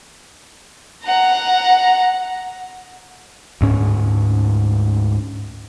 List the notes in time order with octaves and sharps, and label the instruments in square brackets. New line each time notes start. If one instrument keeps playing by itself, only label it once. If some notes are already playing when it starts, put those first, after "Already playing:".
[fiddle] F#5 A#5
[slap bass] D2 G#2 C#4